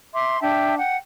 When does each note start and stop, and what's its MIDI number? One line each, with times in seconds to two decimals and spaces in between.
0.13 0.40 76
0.13 0.40 84
0.13 0.40 86
0.41 0.76 62
0.41 0.76 76
0.41 0.76 79
0.41 0.76 81
0.78 0.97 78
0.78 0.97 79